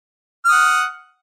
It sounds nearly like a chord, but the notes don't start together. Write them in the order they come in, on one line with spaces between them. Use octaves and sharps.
F6 D#6 F#5